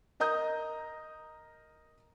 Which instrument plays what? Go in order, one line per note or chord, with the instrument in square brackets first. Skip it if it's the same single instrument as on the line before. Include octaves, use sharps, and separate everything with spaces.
[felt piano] A#4 D#5 A#5 D#6 G6